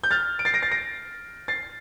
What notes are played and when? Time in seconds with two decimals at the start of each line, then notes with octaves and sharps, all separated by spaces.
0.04 G6
0.11 F6 A6
0.39 D7
0.45 A6 C7
0.54 A#6 D7
0.62 A6 C7
0.71 A#6 D7
1.48 A6 C7